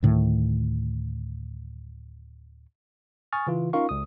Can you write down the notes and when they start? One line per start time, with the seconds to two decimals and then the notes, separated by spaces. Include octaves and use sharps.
0.03 D2 A2 D#3
3.33 G#5 C#6 D#6 F6 A6
3.47 C#3 E3 F4
3.73 C#4 D#4 F4 A#4 F5 C#6
3.89 C#2 D#6